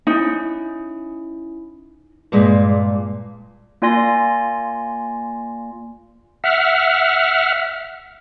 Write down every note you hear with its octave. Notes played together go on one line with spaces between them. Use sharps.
C#4 D#4 E4
G2 A#2 G#3
A#3 F4 D5 G#5 C6 A#6
E5 F#5 F6